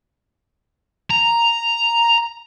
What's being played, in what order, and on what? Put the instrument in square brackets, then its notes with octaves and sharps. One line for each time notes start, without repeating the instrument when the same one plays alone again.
[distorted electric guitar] A#5